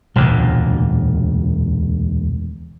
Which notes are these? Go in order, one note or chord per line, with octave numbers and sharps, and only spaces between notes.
E1 D2 A#2